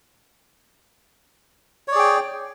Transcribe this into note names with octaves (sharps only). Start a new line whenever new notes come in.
G#4 C#5 D5 G5